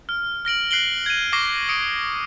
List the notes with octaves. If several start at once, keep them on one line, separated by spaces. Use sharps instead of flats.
F6
F6 A#6 D7 F#7
F#6 C7 D7 F#7 G7
G#6 D#7
C#6 D6 A#6 C7 G7
D#6 C#7 D7